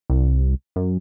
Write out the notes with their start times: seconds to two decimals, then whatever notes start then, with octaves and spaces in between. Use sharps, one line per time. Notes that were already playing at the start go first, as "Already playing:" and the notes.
0.10 C2
0.76 F#2